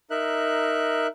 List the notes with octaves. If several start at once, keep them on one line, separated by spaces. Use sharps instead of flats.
D#4 A#4 E5 F#6